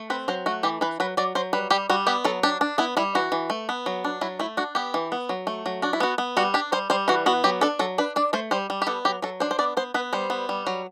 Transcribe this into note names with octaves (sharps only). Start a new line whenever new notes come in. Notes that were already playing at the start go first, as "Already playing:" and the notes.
Already playing: A3
C4 B4
F#3 C5
A3 F#4
E3 G4
E3 B4
F#3 B4
F#3 D5
F#3 C5
G3 B4
G3 G4
G3 F#4
B3 G4
F#3 A4
D4 G4
D4
B3 E4
G3 E4
E3 F#4
E3
A3
B3
F#3
D4
F#3 E4
A3 E4
D4 F#4
B3 G4
E3
B3
F#3
A3
F#3
D4 F#4
E4
B3 F#4
B3
G3 F#4
D4 G4
G3 C5
G3 C5
E3 F#4
B3 F#4
F#3 G4
D4 A4
F#3 A4
D4 B4
D4 D5
A3 C5
G3 C5
G3
G4
B3 A4
F#3 G4
F#3 A4
D4 C5
C5
B3 D5
B3 C5
B3 B4
G3 C5
B3
G3
F#3